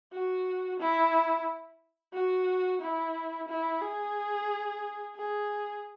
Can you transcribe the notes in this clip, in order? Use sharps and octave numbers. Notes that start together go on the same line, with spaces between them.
F#4
E4
F#4
E4
E4
G#4
G#4